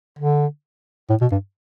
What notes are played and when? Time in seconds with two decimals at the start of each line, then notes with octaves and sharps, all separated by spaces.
0.19 D3
1.10 A2
1.21 B2
1.32 G2